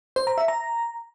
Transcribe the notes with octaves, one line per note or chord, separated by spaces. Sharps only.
C5
A#5
E5
A#5